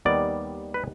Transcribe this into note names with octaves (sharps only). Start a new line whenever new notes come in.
D#2 D#3 G3 B3 D5
B4